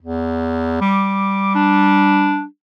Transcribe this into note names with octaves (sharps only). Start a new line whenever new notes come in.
E2
G3 D6
D4